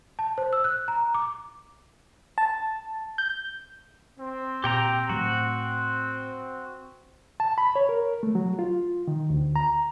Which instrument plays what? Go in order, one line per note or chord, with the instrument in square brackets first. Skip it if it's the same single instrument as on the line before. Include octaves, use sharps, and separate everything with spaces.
[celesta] A5
C5
E6
F#6
A#5
D6
[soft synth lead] A5
G6
[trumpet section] C4
[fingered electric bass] A#2 [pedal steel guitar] G4 G5 A#5
[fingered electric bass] A2 F#3 [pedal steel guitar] F#4
[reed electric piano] A5
B5
C#5
A#4
A3
F#3
F4
D#3
D2
A#5